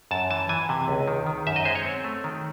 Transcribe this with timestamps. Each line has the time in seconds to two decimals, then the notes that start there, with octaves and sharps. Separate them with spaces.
0.11 F#2 A5
0.31 E3 A5
0.49 E3 G#5
0.69 C3
0.88 C#2
1.08 D#3
1.26 D#3
1.47 F#2 E5
1.56 D#5
1.65 G#3 C5
1.75 C#5
1.85 C4
2.04 A3
2.24 D#3